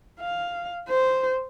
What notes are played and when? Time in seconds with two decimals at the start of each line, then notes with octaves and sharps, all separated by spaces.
0.20 F5
0.89 C5